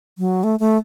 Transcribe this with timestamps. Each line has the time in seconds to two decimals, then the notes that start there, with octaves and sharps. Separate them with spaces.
0.18 F#3
0.43 A3
0.60 A3